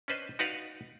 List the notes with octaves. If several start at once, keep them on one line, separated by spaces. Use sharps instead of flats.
C#4 D4 B4 C5 D#5
D#4 F#4 B4 D5 F5